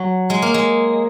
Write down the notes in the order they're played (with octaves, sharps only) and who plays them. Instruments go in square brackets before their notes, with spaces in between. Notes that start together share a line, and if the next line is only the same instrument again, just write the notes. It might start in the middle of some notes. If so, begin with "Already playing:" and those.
Already playing: [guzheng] F#3
G#3
A#3
G#3